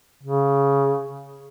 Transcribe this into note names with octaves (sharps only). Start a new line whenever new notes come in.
C#3